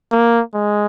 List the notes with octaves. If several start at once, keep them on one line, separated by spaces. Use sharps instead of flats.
A#3
G#3